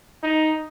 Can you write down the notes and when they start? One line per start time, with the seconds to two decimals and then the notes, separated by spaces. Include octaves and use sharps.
0.23 D#4